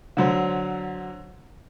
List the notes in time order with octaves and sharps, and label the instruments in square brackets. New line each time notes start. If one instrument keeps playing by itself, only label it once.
[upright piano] D3 F#3 C5